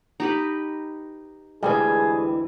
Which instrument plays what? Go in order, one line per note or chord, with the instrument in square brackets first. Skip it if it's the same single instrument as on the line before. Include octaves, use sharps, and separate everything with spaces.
[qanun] D#4 G4 B4
[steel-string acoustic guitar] D2 G2 E3 [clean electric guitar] G3 G#3 [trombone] G#4